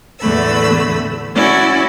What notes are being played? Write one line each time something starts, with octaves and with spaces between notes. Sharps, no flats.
E2 A2 D3 A3 B5 E6
C#4 E4 F#4 D5